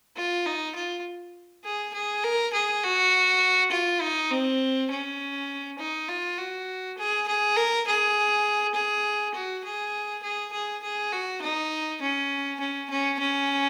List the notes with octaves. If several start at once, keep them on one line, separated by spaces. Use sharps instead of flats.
F4
D#4
F4
G#4
G#4
A#4
G#4
F#4
F4
D#4
C4
C#4
D#4
F4
F#4
G#4
G#4
A#4
G#4
G#4
F#4
G#4
G#4
G#4
G#4
F#4
D#4
C#4
C#4
C#4
C#4